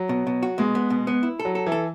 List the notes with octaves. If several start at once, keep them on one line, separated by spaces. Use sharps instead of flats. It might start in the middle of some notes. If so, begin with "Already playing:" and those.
Already playing: F#3
B2
B2
F#4
B2 G#3
B3
B2
B3
E4
A4
F#3
A4
E3
A4